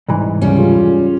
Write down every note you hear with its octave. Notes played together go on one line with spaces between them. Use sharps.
C2 G#2 E3
F1 C#2 G3 C#4
F4 G#4